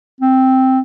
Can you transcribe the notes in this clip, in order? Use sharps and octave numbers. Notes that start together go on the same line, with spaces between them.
C4